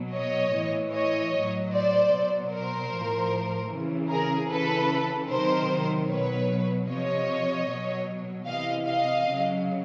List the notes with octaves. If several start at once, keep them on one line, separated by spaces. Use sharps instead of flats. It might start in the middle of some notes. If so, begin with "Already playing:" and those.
Already playing: B2 F#3
C#5 D#5
A2 E3
C#5 D#5
A2 F#3
C5 D5
B2 F#3
A#4 C5
A2 F3
C#3 E3
G#4 A#4
C#3 E3 A4 B4
C3 D#3 F#3 A#4 C5
B2 F#3 B4 C#5
C3 F3 C#5 D#5
B2 F#3
C3 E3 D#5 F5
D#5 F5
C#3 F#3